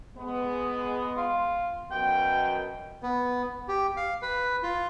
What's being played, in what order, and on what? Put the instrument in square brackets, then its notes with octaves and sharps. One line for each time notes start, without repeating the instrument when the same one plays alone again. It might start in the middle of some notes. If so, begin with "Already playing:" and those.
[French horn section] G#3 B3
[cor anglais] F4
[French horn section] F#2 B2 [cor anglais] G5
[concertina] B3
G4
F5
B4
F4